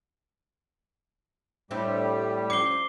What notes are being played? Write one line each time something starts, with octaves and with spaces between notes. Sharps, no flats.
A2 G3 A3 C4 D4 G4
F3 C#4 D6 C7 G7